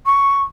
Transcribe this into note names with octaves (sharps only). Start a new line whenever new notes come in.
C#6